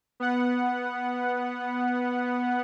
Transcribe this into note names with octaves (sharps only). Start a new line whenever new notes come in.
B3 F#5